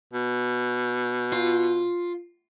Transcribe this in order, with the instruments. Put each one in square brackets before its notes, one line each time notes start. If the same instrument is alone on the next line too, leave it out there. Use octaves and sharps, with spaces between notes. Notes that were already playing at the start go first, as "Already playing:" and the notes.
[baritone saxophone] B2
[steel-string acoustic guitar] F4